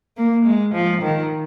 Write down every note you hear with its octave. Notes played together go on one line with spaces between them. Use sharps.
A#3
G#3
F3
D#3